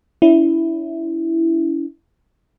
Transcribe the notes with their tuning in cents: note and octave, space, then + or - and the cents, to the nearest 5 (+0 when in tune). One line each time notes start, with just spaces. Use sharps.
C#4 +45 E4 +0